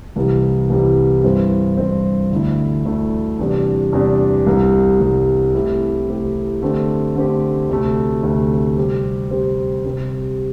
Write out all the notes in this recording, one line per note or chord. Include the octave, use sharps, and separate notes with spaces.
C2 C3 E3 G3
C2 C3 E3 G3
G2 E3 C4
G2 E3 C4
D2 D3 A3 E4
D2 D3 A3 E4
E2 C3 E3 G3 D4
E2 C3 E3 G3 D4
C2 C3 G3
C2 C3 G3
C3 A3 C4 E4 G4
C3 A3 C4 E4 G4
D3 A3 C4 G4
D3 A3 C4 G4
D2 C3 A3
D2 C3 A3
C3 G3 C4 G4
C3 G3 C4 G4
C3 G3 C4 G4